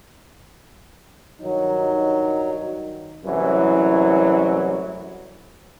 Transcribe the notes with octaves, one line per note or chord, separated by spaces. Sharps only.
G2 D#3 F#3 D#4
C2 F#2 A2 E3 F#3